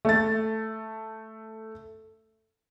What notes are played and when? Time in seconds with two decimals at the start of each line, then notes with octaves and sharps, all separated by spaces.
0.05 A3 A6